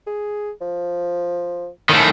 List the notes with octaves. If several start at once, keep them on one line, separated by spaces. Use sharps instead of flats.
G#4
F3
A2 D#3 A3